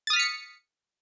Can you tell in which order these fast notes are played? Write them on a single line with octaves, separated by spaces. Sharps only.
A6 D#6 F6 B6 C#7